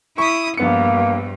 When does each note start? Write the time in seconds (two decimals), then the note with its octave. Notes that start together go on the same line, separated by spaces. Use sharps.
0.18 E4 C#6 D#6
0.58 A#1 G2 A#3 B3 C#7